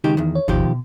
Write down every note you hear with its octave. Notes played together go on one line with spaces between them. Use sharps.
C#2 D#3 D#4 G4
E2 D#3
C#5
G1 D#2 B2 D#3 F3 G4
B2